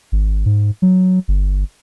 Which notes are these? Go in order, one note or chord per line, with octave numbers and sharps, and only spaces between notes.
G#1
G#2
F#3
G1